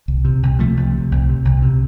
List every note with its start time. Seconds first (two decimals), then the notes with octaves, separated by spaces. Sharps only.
0.08 C2
0.25 C3
0.43 C2
0.59 C3 F3 A3
0.77 C2
0.94 C3
1.12 C2
1.29 C3
1.45 C2
1.62 C3